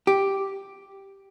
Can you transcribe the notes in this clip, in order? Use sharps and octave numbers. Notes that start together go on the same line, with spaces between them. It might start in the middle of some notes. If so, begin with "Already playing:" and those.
G4